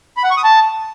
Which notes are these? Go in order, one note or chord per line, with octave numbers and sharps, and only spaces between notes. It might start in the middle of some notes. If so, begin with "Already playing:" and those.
B5
F#5
C#6
D#6
A5